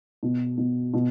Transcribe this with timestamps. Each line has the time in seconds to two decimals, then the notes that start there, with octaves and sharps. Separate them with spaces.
0.23 B2
0.58 B2
0.94 B2